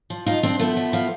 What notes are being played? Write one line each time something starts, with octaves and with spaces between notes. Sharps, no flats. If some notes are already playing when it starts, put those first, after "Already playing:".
F3
F3 D#4 F4
F3 C4 D4
F3 A3 B3
F3
F3